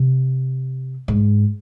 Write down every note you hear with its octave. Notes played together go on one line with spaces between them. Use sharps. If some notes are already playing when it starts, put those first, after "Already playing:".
Already playing: C3
G#2